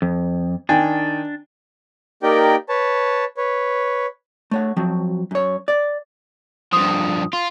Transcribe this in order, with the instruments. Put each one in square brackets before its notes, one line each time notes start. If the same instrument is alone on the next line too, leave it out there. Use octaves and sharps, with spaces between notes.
[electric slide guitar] F2
[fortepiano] D#3 G5 G#5 [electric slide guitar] D4
[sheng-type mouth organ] A#3 D#4 G4 A#4 D5 G5
B4 C#5 A5
B4 C#5
[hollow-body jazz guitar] A3 C#5 F#5
F3 F#3 C4 F#4
F#2 C#5
D5
[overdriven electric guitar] G2 F3 [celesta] D#6
[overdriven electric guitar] F4